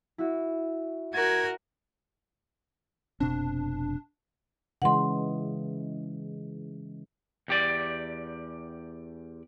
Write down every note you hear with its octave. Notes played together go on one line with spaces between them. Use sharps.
E4 F#4
F#4 A#4 G#6 A6
F1 B2 C4 D4
C#3 E3 G#3 F#5 C6
E2 G4 D5